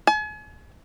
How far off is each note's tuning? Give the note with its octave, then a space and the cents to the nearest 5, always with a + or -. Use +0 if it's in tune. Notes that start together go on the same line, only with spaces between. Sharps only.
G#5 +40